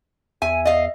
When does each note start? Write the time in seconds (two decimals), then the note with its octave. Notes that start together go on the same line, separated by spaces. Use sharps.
0.42 E2 E5 G#5
0.65 D#5 F5